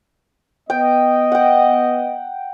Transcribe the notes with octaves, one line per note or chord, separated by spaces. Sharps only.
B3 D#5 G5
F#5 G5